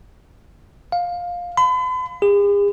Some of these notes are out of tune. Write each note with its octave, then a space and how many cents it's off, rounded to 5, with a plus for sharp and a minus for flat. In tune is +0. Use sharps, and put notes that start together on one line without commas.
F5 +15
B5 +45
G#4 -45